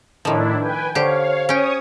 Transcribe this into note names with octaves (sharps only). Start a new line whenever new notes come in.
A2 D#3 F3 D4 E4
B4 G5 G#5
D3 G4 C5 C#5 F5
C#4 C#5 G5 C#6 D#6